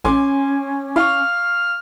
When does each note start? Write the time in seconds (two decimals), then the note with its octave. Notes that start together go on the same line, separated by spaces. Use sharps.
0.04 A1 C#4 G#5 C6 D6
0.96 E4 F5 C#6 F6